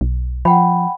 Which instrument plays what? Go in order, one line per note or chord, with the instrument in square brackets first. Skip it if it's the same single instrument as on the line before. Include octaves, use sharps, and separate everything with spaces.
[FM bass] B1
[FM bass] F3 [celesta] F#5 G5 B5